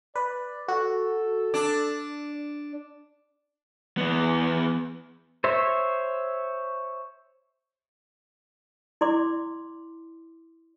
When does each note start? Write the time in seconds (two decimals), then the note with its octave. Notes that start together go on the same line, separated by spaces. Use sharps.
0.16 B4 D5
0.68 F#4 A4
1.54 D4 D5
3.98 E2 B3
5.44 C5 C#5 E5
9.01 E4 D5 C6 D6